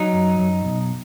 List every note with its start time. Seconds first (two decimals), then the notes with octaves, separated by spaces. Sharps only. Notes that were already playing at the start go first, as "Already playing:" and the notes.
Already playing: F#3 D#4
0.13 F#2
0.39 F#2
0.65 B1